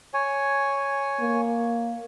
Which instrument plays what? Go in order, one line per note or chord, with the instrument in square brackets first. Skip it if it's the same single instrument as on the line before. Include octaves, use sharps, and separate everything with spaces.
[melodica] C#5 G#5
[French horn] A#3